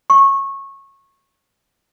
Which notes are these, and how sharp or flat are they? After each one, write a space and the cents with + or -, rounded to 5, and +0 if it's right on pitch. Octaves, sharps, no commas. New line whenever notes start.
C#6 -20